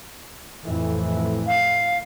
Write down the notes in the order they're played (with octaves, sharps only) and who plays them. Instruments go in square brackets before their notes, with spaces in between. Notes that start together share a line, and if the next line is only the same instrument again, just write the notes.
[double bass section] F2 A2 E3
[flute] F5